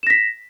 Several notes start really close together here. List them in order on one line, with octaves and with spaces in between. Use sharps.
E7 A#6 B6